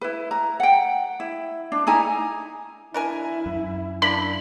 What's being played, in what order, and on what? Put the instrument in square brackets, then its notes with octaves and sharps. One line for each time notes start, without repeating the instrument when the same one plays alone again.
[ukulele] E4 B4
A#5
F#5 G5
E4
D4
D#4 E4 G#5 A#5
[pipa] D4 A#4 G#5 [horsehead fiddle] E4
[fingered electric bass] F#2
[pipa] A#3 D4 E4 [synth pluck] B5